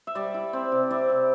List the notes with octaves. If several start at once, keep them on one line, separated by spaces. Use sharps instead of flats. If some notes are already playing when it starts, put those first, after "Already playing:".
E5
G3 D5
E4
C4
C3
E4 D5
C3